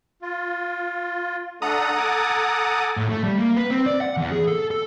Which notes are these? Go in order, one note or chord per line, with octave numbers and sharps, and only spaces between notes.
F4
A3 D4 A4 F#5 A#5 D#6
A4 G#5 D6
A2
A3
G3
A#3
B4
C4
D5
F#5
E2
G#4
A4
A4